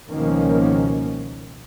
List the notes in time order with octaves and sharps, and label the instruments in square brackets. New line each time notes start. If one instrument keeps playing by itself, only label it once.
[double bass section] C#2 B2 D#3 F3 A#3 C#4